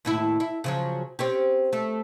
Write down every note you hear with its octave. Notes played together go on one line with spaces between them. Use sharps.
D#2 A2 E4
E4
C#3 F3 F#3
C4 C#4 G4
A3